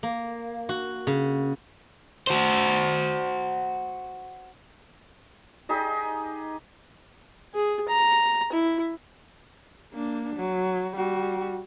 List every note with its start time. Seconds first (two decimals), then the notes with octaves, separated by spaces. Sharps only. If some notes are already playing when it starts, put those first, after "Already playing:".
0.03 A#3
0.69 F#4
1.07 C#3
2.27 F#4 C5
5.69 D#4 G4 G#4 D#5
7.54 G#4
7.89 A#5
8.52 E4
9.93 A#3 D4
10.36 F#3
10.96 G3 F#4